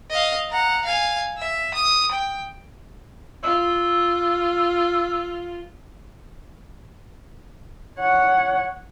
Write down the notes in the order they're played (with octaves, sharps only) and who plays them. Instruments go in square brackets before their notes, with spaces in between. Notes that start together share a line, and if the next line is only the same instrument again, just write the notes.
[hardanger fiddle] D#5 F5
F#5 A#5
F5 G#5
E5
D#6
G5
[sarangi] F4 [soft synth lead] E6
[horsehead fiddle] C#5 F#5